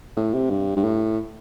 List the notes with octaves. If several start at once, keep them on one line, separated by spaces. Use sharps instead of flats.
A2
C3
G2
G2
A2